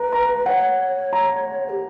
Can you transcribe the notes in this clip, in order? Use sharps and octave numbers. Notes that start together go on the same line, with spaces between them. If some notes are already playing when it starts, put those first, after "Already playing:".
Already playing: B4 A#5
A#5
C#5 F#5
A#5
G4